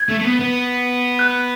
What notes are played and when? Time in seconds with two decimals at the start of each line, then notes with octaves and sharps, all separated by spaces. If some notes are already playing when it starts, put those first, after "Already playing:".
Already playing: G#6
0.09 A3
0.20 A3
0.24 B3
0.40 B3
1.19 F#6